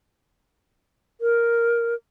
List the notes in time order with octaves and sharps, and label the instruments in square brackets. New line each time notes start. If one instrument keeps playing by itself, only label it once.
[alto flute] A#4